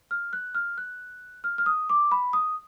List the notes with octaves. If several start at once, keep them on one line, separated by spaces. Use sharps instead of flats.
F6
F#6
F6
F#6
F6
F6
D#6
D6
B5
D#6